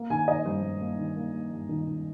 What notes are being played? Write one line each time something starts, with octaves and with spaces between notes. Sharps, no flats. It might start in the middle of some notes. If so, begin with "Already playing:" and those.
Already playing: A#3
D#3 G#5
D#3 D#5
G2 C5
G2
A#3
D#3
A#3
A#3
G2
D#3
D#3